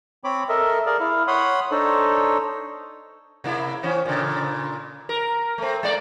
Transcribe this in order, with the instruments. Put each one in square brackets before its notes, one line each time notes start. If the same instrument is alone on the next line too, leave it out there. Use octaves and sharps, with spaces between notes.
[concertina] C4 C#5 B5 D6
A4 A#4 D#5 E5
G#4 A#4 D5 F5
E4 F5
C#5 F#5 B5 C6 D#6
D4 D#4 A4 C5 C#5
[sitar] C3 A#3 E4
E3 C4 C#4
A#2 C#3
A#4
A3 C4
G#3 A#3 D5